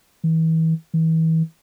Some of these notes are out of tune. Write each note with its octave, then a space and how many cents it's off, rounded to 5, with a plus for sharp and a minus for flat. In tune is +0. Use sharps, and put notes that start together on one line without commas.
E3 -35
E3 -35